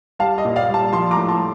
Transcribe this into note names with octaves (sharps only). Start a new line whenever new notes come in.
G3 F5 A5
D#5
A#2
D5 F5
G3 F5 A5
F3 A5 C6
A#5 D6
A2
A5 C6